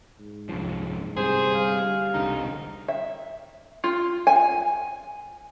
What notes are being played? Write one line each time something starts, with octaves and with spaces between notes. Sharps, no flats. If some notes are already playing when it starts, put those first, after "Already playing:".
G#2
C2 F#2 F3
G1 G2 C3 G#4 C5
G3 F5
E1 C2 D3 D#4
E5
F4
G#5